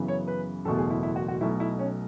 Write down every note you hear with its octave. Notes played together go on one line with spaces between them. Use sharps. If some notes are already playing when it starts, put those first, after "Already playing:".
Already playing: F#2 C#3 E3 B3
C#5
B4
F#1 E2 B2 A3 A4
G#4
E4
E4
F#4
F#4
B1 B2 A3 E4
E4
C#4